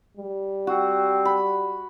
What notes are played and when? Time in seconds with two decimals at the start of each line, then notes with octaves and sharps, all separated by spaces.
0.17 G3
0.67 C4 F#4
1.25 B5